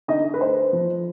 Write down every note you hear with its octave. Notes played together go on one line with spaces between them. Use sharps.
D3 D#4 D#5
B4
A3 C5
F3